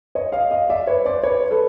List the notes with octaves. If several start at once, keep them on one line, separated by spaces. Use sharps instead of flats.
C#5 D#5
D#5 F5
D#5 F5
D5 E5
B4 C#5
C5 D5
B4 C#5
A4 B4